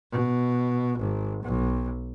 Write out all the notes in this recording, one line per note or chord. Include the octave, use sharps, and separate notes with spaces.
B2
G#1
B1